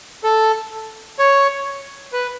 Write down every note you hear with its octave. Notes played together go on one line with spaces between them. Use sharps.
A4
C#5
B4